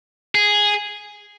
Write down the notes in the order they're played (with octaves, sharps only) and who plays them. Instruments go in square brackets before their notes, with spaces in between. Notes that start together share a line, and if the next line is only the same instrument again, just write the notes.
[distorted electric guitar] G#4